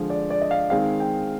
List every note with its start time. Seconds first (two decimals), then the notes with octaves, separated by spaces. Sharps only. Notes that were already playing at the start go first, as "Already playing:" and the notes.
Already playing: D3 F3 G#3
0.10 D5
0.30 D5
0.41 D#5
0.51 F5
0.70 D#3 G#3 C4 F5
1.00 G5